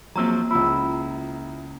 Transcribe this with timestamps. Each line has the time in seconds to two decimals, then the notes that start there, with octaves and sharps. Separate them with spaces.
0.16 F3 F#3 A#3 C4 A#5
0.51 C#2 F3 E4